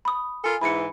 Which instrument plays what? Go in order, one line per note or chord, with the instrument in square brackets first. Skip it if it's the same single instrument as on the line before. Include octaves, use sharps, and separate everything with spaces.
[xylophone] B5 D#6
[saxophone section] F4 A4 A#4 [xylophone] G#5
[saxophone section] G#2 E3 [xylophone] B5 C#7